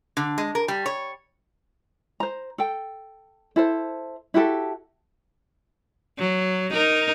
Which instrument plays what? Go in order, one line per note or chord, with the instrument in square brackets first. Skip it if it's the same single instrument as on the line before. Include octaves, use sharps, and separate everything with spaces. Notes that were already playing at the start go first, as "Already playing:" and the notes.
[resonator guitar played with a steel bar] D3
G#3
A#4
G3
C#5
[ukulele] C5 A#5
A4 G5
E4 A4 C5
E4 F#4 G4 A4
[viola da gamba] F#3
D#4 A#4